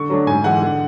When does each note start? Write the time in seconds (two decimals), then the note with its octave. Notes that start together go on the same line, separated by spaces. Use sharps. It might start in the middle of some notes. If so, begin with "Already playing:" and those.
Already playing: D3 C#6
0.10 F#3 A3 D4
0.27 G#2 G#5
0.44 E3 G#3 F#5
0.62 D3